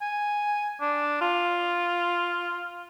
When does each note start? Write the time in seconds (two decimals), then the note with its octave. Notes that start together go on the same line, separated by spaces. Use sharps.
0.02 G#5
0.81 D4
1.21 F4